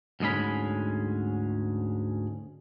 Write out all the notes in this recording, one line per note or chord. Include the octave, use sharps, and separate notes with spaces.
D2 G#2 G#3 C#4 B5